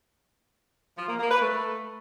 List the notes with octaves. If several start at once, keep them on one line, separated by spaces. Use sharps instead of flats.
F3
A#3
A#3
B4
A3